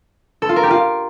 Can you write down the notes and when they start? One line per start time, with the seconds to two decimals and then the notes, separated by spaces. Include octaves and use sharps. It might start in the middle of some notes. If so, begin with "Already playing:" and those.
0.42 A4
0.49 F4
0.56 A#4
0.63 G4
0.71 F4